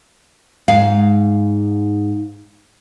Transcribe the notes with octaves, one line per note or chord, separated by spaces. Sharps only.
G#2 F5